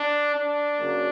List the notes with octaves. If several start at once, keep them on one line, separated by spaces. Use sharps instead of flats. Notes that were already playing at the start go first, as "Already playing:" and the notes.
Already playing: D4
D4
F#2 C#3 F#3 A#3